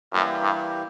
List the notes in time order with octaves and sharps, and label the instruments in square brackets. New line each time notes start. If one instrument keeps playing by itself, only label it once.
[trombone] F#2 [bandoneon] E3 G3 A#3 E4 G4
[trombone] G2